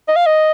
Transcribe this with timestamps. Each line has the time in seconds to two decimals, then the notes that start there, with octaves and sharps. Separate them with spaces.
0.08 D#5
0.16 F5
0.26 D#5